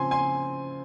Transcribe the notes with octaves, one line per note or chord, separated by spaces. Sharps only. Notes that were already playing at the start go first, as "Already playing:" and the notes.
Already playing: C#3 F3 C4 G#5 C6
G#5 C6